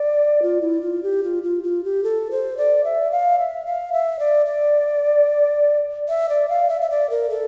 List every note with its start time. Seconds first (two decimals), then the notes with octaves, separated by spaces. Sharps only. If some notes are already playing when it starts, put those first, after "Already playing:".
Already playing: D5
0.42 F4
0.62 E4
0.82 F4
1.03 G4
1.24 F4
1.43 F4
1.63 F4
1.84 G4
2.04 A4
2.31 C5
2.57 D5
2.84 E5
3.11 F5
3.39 E5
3.66 F5
3.93 E5
4.19 D5
4.46 D5
6.09 E5
6.29 D5
6.49 F5
6.69 E5
6.81 E5
6.91 D5
7.10 A#4
7.30 A4